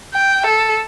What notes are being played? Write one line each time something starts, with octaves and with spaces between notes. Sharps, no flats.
G5
A4